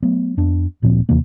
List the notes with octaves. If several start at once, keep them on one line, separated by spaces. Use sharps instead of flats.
F#3 A3 B3
F2 B3 D4
D1 A#2 F3 C4
D#2 C3 E3 A#3